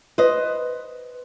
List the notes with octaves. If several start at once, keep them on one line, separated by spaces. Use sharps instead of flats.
B4 C5 D#5